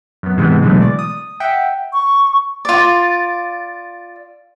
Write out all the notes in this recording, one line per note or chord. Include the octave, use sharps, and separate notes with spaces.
F#2 B3
G#2 C3 E3 G#3 B3
B2 D3 E3 F#3 G#3 A3
D5
D#6
E5 F#5 G5
C#6
F4 D5